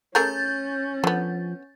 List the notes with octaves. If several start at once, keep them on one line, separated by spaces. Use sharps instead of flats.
A3 C#4 G#4 A#4 G6 A6
D3 F3 B3